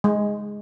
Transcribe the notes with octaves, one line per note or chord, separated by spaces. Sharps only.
G#3